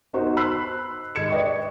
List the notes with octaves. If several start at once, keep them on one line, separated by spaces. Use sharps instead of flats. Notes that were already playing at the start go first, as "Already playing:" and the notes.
B3 D#4 F#4 C5
B5 E6 F#6 C7
G#2 G#6 C#7 E7
B4 D5 D#5 G5 C#6